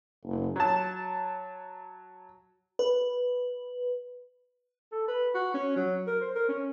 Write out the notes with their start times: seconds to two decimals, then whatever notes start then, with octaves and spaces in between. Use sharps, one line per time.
0.24 F#1
0.56 F#3 A5
2.79 B4
4.92 A4
5.08 B4
5.35 F#4
5.54 C#4
5.76 F#3
6.07 A#4
6.21 C5
6.36 A#4
6.49 C#4